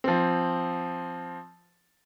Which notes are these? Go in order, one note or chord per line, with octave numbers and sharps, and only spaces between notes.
F3 C4